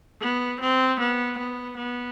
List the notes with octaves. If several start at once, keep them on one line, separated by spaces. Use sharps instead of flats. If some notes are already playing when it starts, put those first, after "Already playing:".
B3
C4
B3
B3
B3